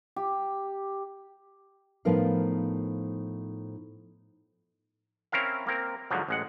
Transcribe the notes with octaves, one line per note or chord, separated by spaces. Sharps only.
G4
A2 F3 B3 D#4 A#4 F5
C4 C#4 E4 A#4 F5
A#3 C4 A#4
G#2 D3 F3 F#3
A1 G#3 F#5